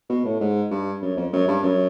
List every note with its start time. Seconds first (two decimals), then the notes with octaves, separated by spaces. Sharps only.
0.09 B2
0.25 A2
0.40 G#2
0.71 G2
1.02 F#2
1.17 F2
1.33 F#2
1.47 G2
1.63 F#2